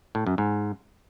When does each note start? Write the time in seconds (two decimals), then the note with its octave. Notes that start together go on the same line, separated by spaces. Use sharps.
0.15 A2
0.27 F#2
0.38 G#2